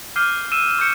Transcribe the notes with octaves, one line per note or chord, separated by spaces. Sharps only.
D6 F6 G6 C7 D#7 G7
E6 D#7 E7
C#6 G6 C#7 E7